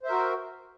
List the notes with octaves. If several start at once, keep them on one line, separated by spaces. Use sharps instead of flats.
F#4 A#4 C5 E5